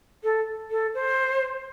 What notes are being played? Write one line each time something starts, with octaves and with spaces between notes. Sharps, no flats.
A4
A4
C5